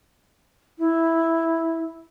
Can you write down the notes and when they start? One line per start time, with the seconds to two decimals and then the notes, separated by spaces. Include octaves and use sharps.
0.79 E4